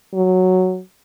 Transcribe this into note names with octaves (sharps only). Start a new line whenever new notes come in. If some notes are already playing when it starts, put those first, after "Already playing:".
F#3